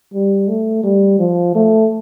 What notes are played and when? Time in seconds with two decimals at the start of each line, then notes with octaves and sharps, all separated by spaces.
0.13 G3
0.48 A3
0.83 G3
1.19 F3
1.55 A3